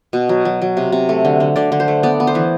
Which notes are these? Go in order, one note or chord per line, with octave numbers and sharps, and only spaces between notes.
B2
F#3
F#3
F#3
C3
C3
A3
D3
D3
D3 D5
D3
C5
A3
B3 D5
B3
C5
E3